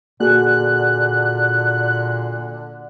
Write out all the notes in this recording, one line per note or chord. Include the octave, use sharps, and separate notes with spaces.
A#2 D3 A#3 F#4 G#4 F#6